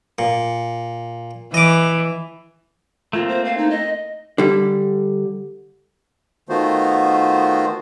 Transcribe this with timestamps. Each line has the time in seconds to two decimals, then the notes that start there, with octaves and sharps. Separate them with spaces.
0.19 A#2
1.54 E3 D#5 D6
3.13 A3 A#3 C4 F4
3.28 C5
3.44 F5
3.57 D#4
3.70 D#5
4.38 D3 G3
6.49 D#3 A3 B3 F4 F#4 C5